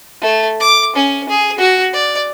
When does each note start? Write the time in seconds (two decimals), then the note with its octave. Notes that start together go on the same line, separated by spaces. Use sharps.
0.22 A3
0.60 D6
0.96 C#4
1.29 G#4
1.59 F#4
1.93 D5